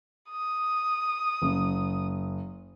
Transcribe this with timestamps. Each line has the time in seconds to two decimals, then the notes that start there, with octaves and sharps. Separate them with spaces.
0.30 D#6
1.42 F#1